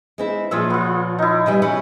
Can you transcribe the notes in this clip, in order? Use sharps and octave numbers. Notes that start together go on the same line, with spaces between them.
G#3 C4 E4
A#2 F3 F#3 F4 G#4 E5
B3 F4
D#4 E4
B2 E3 G3
E3 F#3 C#4